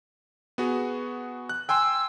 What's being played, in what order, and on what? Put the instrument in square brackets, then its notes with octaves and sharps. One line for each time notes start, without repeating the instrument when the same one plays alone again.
[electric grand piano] B3 F#4 G#4
F#6
[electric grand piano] G5 G#5 C6 [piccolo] E6